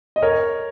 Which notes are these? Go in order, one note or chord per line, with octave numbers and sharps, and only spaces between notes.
D#5
A#4 C#5